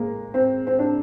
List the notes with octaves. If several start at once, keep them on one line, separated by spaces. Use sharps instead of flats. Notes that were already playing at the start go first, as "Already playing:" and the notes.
Already playing: G#3 A#3
C4
C4
D4